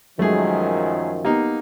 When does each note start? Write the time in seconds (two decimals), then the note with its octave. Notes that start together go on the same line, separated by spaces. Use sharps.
0.19 F#2 D#3 F3 F#3 G#3 A3 G#4
1.25 A#3 B3 D#4 G4